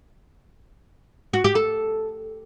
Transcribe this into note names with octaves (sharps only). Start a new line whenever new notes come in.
F#4
G4
A4